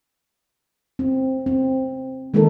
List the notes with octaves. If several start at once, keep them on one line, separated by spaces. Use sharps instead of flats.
C4
C4
D#3 G#3 A#3 D#4 A4 A#4